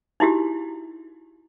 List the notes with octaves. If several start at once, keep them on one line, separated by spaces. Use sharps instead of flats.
D#4 E4 F#4 G4